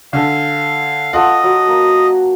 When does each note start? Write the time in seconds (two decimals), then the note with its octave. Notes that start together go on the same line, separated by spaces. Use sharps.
0.13 D3 A4 F5 G#5
1.13 F4 A4 D#5 F#5
1.43 F#3
1.67 A#3